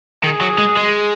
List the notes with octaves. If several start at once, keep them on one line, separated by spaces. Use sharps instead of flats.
D#3 G#4
F#3
G#3
G#3